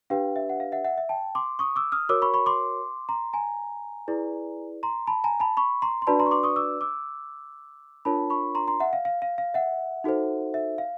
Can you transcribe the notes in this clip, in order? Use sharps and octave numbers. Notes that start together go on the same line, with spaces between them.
D4 G4 B4 F5 G5
E5
F#5
F5
E5 F#5
E5 F#5
E5
G5 A5
C6 D6
C#6 D#6
D6 E6
D#6 F6
F#4 A#4 C#5 D6 E6
B5 C#6
B5 C#6
C6 D6
A#5 C6
G#5 A#5
E4 G#4 B4 D5
A#5 C6
A5 B5
G#5 A#5
A5 B5
B5 C#6
A#5 C6
C6
D4 F#4 B4 D5 A5 B5
A#5 C6
C#6
C6 D6
C#6 D#6
D6 E6
D6 E6
D4 F4 A#4 C#5 A5 B5
B5 C#6
A#5 C6
A#5 C6
E5 F#5
F5
F5
F5
F5
E5 F#5
D#4 F#4 A4 C5
E5
F5